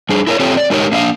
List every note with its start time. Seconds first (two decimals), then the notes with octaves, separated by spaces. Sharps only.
0.09 G3 D4 G#4
0.27 E4 A#4 C5 C#5
0.40 C4 F4 G4 A4 C#5
0.57 D5
0.70 G#3 D#4 G4 A#4 C#5
0.92 A#3 D4 E5 F5